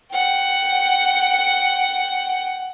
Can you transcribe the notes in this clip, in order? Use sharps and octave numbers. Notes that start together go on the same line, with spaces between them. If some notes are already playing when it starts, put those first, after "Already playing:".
F#5 G5